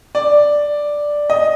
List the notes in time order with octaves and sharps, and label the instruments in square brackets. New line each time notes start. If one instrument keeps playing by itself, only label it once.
[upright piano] D5
D#5